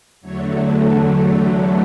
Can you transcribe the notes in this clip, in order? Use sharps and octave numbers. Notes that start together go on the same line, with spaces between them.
E2 D3 F#3 A3 C#5
A4